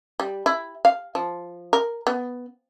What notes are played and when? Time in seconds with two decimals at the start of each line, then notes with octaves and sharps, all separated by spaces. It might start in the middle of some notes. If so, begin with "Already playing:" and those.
0.20 G3
0.46 E4
0.85 F5
1.15 F3
1.73 A#4
2.07 B3